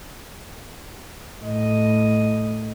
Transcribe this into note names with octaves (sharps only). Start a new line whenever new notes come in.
A2 D#5